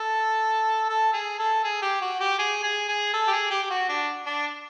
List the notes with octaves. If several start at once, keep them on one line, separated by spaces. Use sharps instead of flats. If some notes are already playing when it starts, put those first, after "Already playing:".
Already playing: A4
A4
G#4
A4
G#4
G4
F#4
G4
G#4
G#4
G#4
A4
G4
G#4
G4
G4
F#4
D4
D4